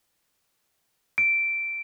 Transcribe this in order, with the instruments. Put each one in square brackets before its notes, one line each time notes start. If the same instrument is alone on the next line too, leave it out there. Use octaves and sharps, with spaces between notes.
[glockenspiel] D7